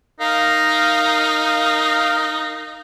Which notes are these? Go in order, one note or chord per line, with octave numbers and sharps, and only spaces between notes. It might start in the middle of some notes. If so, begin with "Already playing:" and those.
D#4 A#4 F5